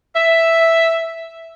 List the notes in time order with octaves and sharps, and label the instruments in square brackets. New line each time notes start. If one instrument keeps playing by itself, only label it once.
[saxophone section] E5